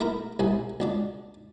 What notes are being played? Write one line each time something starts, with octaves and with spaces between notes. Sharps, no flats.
A3 E4 A#4
C2 C3 G#5
C#2 D4 D5